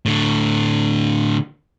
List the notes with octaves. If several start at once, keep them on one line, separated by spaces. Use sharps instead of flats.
A2 D3